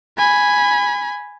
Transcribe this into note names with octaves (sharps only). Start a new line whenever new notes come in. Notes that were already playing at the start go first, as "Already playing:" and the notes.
G#5 B5